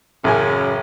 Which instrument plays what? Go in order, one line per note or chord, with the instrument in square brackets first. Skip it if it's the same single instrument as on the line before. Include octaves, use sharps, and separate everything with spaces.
[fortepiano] A1 G#5 [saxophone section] F#2 C#3